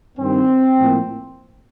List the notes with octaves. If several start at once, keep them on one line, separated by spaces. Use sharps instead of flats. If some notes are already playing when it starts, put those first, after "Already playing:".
G2 D#3 G3 C4
A2 F3 A#3